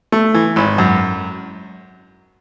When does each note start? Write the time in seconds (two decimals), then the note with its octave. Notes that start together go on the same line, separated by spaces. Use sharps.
0.12 A3
0.34 E3
0.56 G#1
0.78 F#2